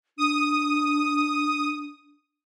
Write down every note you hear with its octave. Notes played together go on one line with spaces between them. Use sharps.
D4 D#6